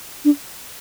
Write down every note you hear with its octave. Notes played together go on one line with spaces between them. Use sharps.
D4